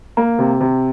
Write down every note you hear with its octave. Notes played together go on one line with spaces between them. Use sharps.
A#3
C3
C3